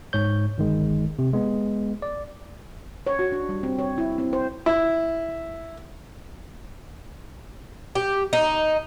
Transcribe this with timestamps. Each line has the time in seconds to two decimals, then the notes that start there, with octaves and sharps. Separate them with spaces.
0.13 G#2 C#5 G6
0.58 G1 D#3 G#3
1.19 C3
1.34 G#3 B3
2.02 D5
3.07 C#5
3.19 F#4
3.32 D4
3.49 G3
3.63 C4
3.79 C#5
3.98 E4
4.18 C4
4.33 C5
4.66 E4
7.95 G4
8.33 D#4